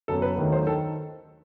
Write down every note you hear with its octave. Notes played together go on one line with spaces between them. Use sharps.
F#1 F#2 F#3 B3 A4
B4
D#2 D#3 F#3 A3
C5
D#3 A4